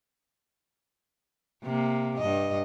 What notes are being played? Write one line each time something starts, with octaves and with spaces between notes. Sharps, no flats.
C3 A#3
G2 D#5